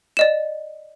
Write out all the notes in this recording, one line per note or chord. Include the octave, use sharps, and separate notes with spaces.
D5 D#5 E7